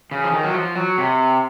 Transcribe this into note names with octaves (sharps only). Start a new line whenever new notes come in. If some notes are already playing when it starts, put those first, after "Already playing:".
C#3
F3
D#3
F#3
F3
F#3
C3